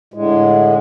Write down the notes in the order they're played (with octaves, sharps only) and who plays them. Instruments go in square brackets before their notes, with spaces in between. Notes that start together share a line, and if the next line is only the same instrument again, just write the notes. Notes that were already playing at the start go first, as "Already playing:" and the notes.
[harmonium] A2 D3 G#3